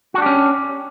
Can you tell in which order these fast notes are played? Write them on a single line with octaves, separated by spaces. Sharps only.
F#4 D4 G4 C#4